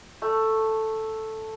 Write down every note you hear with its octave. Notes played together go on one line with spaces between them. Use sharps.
A3